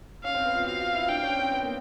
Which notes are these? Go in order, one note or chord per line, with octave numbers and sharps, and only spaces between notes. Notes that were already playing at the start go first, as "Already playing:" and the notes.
C#4 F5
C4
B3
F4
F#4 F5
F4
E4
D4 G5
C#4
C4
B3
A#3